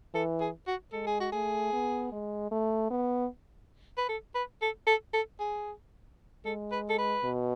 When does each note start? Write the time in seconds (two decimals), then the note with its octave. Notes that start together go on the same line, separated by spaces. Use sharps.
0.14 E3 A4
0.41 G#4
0.67 F#4
0.93 G#3 A4
1.07 G#4
1.20 F#4
1.32 A3 G#4
1.73 B3
2.12 G#3
2.51 A3
2.90 B3
3.98 B4
4.09 A4
4.35 B4
4.62 A4
4.87 A4
5.13 A4
5.40 G#4
6.45 G#3 A4
6.72 B4
6.90 A4
6.98 B4
7.24 B2